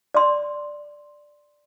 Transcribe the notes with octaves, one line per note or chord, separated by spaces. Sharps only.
D5 C6